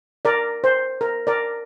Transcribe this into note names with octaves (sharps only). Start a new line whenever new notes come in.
A#4 D5
C5
A#4
A#4 D5